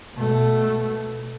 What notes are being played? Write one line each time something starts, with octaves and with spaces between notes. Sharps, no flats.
B2 A3